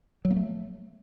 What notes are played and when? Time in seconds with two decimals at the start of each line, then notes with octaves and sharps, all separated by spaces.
0.25 F#3
0.31 A#3
0.37 A3